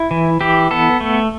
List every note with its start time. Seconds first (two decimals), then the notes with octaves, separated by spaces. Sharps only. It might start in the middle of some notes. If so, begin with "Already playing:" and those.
Already playing: E4
0.11 E3
0.41 E3 G4
0.71 B3 A4
1.01 A3